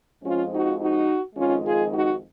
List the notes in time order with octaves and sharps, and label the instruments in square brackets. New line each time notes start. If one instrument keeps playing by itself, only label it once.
[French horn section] F2 F3 G#3 C#4 F4
D#4 F#4
D#4 F#4
F2 D#3 G#3 C#4 F4
F4 G#4
D#4 F#4